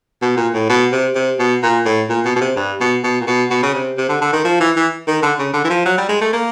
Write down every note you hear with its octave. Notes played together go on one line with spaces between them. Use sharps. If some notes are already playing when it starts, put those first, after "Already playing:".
B2
A#2
A2
B2
C3
C3
B2
A#2
A2
A#2
B2
B2
C3
G2
B2
B2
A#2
B2
B2
C#3
C3
C3
D3
D3
D#3
F3
E3
E3
D#3
D3
C#3
D3
E3
F3
F#3
G3
G#3
A3
A#3